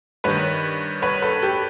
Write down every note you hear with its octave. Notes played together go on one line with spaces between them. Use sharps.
G2 D#3 B4 C#5
B4 C#5
A4 B4
G4 A4